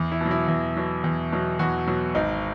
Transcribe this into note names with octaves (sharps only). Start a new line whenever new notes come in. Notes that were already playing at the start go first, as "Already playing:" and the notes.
Already playing: E2
E4
B2 F#3
E4
E2
B2 F#3
E2
B2 F#3
E2 F#4
B2 F#3
G#1 D#4